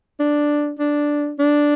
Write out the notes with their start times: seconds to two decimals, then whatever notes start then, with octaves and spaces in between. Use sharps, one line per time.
0.20 D4
0.79 D4
1.39 D4